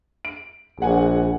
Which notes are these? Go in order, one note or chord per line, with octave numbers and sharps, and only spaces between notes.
D7
A#1 G#4 F#5 G#5